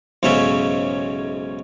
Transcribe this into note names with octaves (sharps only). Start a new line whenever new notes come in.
B1 G#2 C#3 C#4 E5